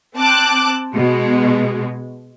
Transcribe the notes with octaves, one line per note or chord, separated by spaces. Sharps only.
C4 A5 D6 F#6
B2 G#3